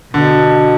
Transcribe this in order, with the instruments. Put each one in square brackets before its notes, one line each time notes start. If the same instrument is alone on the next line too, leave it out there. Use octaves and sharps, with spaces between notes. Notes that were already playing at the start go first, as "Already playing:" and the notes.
[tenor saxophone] B2 [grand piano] D3